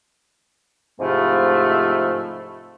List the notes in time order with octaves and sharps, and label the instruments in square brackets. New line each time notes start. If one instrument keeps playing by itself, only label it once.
[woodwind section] G#2 C3 F3 A3 E4 F4